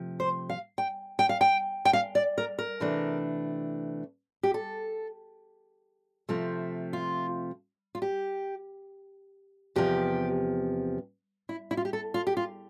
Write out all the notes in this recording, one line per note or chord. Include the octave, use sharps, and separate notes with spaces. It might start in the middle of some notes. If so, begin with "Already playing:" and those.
Already playing: C3 F3 A3
C5
F5
G5
G5
F5
G5
G5
F5
D5
A#4
A#4
C3 E3 A3 D4
G4
A4
C3 F3 A3
F4
F4
G4
E2 C3 F3 G4
E4
E4
F4
G4
A4
F4
G4
F4